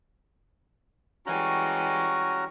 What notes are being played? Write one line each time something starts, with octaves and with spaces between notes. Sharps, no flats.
E3 G3 G#3 C#4 F#4 A#5